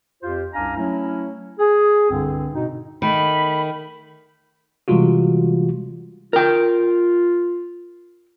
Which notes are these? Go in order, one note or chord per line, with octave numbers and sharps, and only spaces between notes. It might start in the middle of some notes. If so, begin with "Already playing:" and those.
F2 F4 G4 C5
C2 F#2 D4 F5 G#5 A#5
F#3 A3 C#4 E4
G#4
C2 G2 D3 C4
B2 D#4
D#3 A3 B5
C3 E3 G3 G#3 F4 F#4
F4 A#4 G5